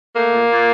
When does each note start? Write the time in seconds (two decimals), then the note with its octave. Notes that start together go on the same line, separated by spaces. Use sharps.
0.15 A3 A#3
0.32 A#2
0.49 A#2